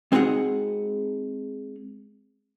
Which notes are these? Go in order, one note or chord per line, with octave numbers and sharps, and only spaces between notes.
G#3 C4 D#4 F#4 G#4 F#5